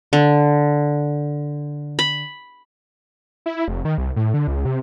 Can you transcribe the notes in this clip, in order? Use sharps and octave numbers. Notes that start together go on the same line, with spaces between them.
D3
B5
E4
F1
D#3
C2
A2
D3
C#2
C3